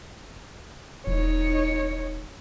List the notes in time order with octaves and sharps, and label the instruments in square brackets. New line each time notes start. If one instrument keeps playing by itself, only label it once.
[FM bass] E1 [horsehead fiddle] D#4 C#5